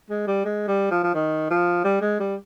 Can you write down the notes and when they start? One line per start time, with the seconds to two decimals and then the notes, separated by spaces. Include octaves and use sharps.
0.10 G#3
0.27 G3
0.45 G#3
0.68 G3
0.91 F3
1.04 F3
1.15 D#3
1.50 F3
1.85 G3
2.01 G#3
2.20 G3